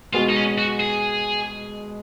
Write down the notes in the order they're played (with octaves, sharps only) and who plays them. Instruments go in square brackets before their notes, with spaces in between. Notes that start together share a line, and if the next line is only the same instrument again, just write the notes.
[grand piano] B2 G#3 B3 F#4 [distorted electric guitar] F4
[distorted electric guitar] D#4
C#4
F#4
G#4